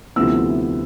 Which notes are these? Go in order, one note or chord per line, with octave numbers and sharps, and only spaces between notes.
D2 C3 F3 B3 E4 E6